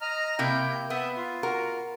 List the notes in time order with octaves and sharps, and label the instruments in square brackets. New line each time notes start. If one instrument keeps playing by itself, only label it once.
[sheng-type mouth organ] D#5 A#5 F6
[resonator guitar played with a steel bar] C3 A#3 E4 [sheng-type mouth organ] G5
[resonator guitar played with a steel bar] B3 [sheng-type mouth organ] E5 D#6
[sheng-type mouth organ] F4
[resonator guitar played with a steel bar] F#4 A#4